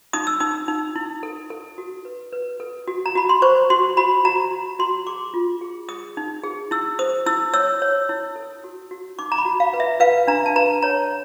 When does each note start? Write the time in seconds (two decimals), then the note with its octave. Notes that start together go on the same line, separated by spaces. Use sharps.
0.13 D#4 D#6
0.27 E6
0.40 D#4 D#6
0.68 D#4
0.96 E4
1.23 A4
1.50 A4
1.78 F#4
2.05 B4
2.32 B4
2.60 A4
2.88 F#4
3.06 A#5
3.16 F#4 B5
3.29 C6
3.42 C5 C#6
3.70 F#4 C6
3.97 F#4 B5
4.25 F#4 A#5
4.52 F#4
4.79 F#4 C6
5.07 G#4 D6
5.34 F4
5.61 G#4
5.89 G#4 D#6
6.17 D#4
6.44 G#4
6.71 E4 E6
6.99 C5 D#6
7.26 E4 E6
7.54 C#5 E6
7.82 C#5
8.09 E4
8.36 A4
8.64 F#4
8.91 F#4
9.19 D#4 D6
9.32 A#5
9.38 B5
9.45 F#4
9.60 F5
9.73 B4
9.80 E5
10.00 B4 F5
10.28 D4 A#5
10.46 A5
10.56 B4 A#5
10.82 C#5 A#5